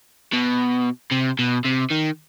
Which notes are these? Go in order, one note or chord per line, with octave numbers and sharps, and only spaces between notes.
B2
C3
B2
C3
D#3